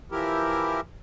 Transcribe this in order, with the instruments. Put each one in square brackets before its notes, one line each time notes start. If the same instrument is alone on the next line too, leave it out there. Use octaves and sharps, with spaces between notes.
[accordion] E3 F3 E4 G4 A#4